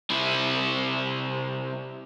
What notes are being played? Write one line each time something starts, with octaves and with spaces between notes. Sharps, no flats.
C3 E4